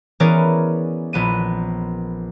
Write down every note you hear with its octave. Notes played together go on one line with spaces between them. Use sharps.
E3 B3 C#4 G#4 A#4 D5
A#1 B3 D#7